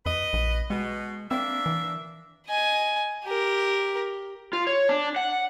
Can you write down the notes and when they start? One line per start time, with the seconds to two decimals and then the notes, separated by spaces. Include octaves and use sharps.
0.06 F2 B4 D#5
0.33 A#1
0.70 B2 G#3
1.31 A#3 C4 D4 E5
1.66 E3
2.47 D#5 G#5
3.25 G4 A#4
4.53 F4
4.67 C#5
4.89 D4
5.16 F#5